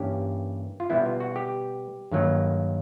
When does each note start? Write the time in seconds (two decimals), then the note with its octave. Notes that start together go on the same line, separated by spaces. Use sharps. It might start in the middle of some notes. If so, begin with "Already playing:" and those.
Already playing: G2 E3 G3 A#3 C#4 G4
0.80 F4
0.90 B2 G3 B3 E4
1.06 F4
1.20 F#4
1.36 G4
2.12 G2 D#3 F#3 A#3